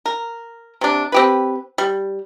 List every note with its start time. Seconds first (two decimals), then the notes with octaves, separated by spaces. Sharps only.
0.06 A#4
0.81 C3 D4
1.12 C4 G4 B4
1.78 G3